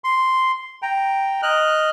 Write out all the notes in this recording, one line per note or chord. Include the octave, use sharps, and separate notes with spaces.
C6
G5 A#5
D#5 F6 F#6